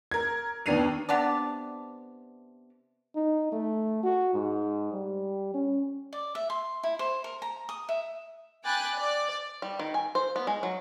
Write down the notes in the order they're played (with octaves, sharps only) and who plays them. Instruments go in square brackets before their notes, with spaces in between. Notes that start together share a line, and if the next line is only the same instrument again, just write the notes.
[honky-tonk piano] A#4 G#6
D#2 B3 D4 C7 D#7 F7
[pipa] C3 B3 D4 D5
[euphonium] D#4
A3
F#4
G#2
G3
C#4
[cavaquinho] D5
E5
C6
E4
C5
A#4
A#5
D#6
E5
[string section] G5 G#5 B5 D6 F#6 A6
D5
[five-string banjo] G3
D#3
G#5
C5
B3
G#3
F#3